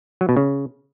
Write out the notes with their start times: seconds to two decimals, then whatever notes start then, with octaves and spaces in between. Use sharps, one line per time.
0.21 F#3
0.29 B2
0.37 C#3